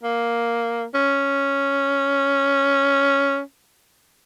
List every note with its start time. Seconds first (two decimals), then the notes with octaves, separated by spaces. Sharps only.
0.03 A#3
0.94 C#4